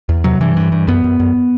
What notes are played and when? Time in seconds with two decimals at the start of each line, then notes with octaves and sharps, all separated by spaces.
0.09 E2
0.24 C3 F#3
0.41 G2 E3
0.56 G2
0.72 G2
0.88 F#2 B3
1.04 F#2
1.20 F#2